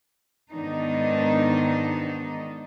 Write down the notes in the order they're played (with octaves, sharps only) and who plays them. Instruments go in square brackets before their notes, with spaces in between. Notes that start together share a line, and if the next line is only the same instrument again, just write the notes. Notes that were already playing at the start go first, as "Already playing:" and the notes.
[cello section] G#2 D#3 B3 D4 D#4